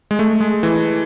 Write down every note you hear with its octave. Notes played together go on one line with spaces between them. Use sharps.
G#3
A3
G#3
E3